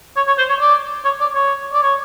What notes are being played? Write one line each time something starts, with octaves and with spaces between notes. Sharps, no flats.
C#5
C#5
C5
C#5
D5
C#5
D5
C#5
D5
C#5